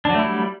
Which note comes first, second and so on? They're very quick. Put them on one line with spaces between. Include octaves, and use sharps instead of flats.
D4 F#3 A3 E4 G3